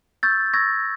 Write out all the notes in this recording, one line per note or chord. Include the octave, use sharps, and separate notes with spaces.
C#6 E6 G6 A6
C#6 E6 G6 G#6 A#6